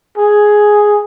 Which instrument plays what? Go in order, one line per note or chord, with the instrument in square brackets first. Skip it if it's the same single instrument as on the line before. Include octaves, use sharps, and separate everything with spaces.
[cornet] G#4